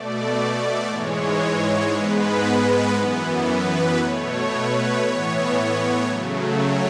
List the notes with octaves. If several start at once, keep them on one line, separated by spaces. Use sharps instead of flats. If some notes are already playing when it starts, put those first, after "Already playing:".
Already playing: B2 A3 D5
G#2 E3 G#3 C#5
G#2 G#3 B3 B4
F#2 E3 B3
B4
B2 A3 C#5
B4
A2 E3 B3 C#5
C#3 F#3 A3
C#5